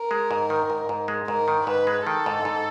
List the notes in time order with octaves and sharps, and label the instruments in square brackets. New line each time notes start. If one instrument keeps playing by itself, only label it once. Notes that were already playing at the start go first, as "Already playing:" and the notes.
Already playing: [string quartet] A#4
[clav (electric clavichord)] G#3
G#2
D#3
G#2
G#2
G#3
[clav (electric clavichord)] G#2 [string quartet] A#4
[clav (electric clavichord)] D#3
[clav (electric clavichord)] G#2 [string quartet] B4
[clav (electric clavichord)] G#3
[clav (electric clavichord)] D#3 [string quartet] A4
[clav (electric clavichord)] G#2
G#2